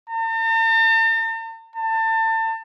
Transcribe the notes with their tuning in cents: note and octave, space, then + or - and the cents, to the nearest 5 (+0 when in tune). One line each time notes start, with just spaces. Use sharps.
A5 +45
A5 +30